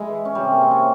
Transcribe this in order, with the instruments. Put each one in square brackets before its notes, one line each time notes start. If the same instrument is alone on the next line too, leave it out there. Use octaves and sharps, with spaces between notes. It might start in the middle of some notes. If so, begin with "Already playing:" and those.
Already playing: [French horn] G#3 [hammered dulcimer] E4
[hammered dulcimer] E3
C#4
G3
[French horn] C3 [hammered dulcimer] G#3
[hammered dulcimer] A#3
C4
C#4